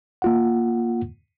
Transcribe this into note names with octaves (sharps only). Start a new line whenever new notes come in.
A#3 F4 F#5